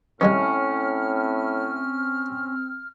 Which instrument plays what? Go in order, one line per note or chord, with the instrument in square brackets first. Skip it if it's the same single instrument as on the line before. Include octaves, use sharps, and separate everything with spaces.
[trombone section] A2 [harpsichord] D#3 G3 G#3 [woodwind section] C4 F6 [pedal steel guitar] C#4